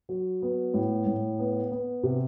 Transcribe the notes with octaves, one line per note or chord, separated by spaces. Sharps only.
F#3
B3
A2
A2
B3
B3
C3